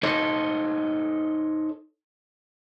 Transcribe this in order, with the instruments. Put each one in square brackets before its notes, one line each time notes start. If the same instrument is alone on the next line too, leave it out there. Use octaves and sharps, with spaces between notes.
[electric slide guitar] D#4 A4 C5 C#5 D#5